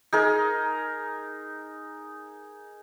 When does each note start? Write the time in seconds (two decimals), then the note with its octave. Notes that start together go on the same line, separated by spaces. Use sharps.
0.13 D#4 G#4 A#4